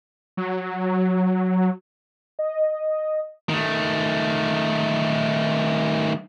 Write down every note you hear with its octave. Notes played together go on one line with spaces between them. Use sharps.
F#3
D#5
D#3 A3